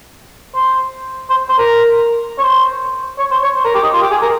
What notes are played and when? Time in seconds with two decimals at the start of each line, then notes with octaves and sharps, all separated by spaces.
0.55 C5
1.30 C5
1.49 C5
1.58 A#4
2.38 C#5
2.43 C5
3.18 C#5
3.31 C5
3.42 C#5
3.56 C5
3.65 A#4
3.74 G4
3.83 D#4
3.93 F4
4.02 G4
4.11 G#4
4.22 A#4